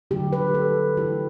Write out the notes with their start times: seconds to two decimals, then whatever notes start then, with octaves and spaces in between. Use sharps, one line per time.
0.11 D3 F#3 A3 G4
0.33 B4
0.54 A4
0.97 E3 A3 E4 G4